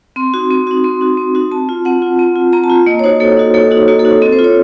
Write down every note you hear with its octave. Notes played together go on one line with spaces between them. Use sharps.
C4 C6
D#4 F#4
C4
D#4 F#4
C4 C6
D#4 F#4
C4
D#4 F#4
C4 A5
F4
C4 F#5
F4
C4
F4
C4 A#5
A5
F4
A#3 D#5
C#5
D#4 F#4 C5
A#3 A4
D#4 F#4
A#3 A4
D#4 F#4
A#3 F#4
A4
D#4 F#4
C4 A4
C5
F4
C#5